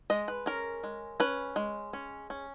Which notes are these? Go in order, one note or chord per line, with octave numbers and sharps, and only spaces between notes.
G#3 D#5
B4
C#4 A#4
G#3
C#4 B4
G#3
C#4
C#4